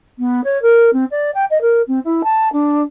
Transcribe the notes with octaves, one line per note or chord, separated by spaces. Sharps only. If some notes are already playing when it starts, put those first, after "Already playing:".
B3
C#5
A#4
C4
D5
G5
D#5
A#4
C4
E4
A5
D4